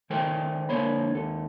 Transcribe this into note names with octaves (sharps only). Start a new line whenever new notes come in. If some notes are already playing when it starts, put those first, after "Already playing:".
D#3 A3 A4 C5 G5
D3 A#3 C5 C#5 B5
D#2 A4